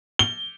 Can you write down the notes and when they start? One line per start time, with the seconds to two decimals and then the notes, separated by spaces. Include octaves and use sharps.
0.19 G7